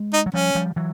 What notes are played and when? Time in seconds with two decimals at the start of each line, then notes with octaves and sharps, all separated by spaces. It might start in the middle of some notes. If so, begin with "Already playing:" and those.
Already playing: G#3
0.14 D#4
0.26 F#3
0.34 F3 G3 C#4
0.55 F3 G3
0.76 E3 F#3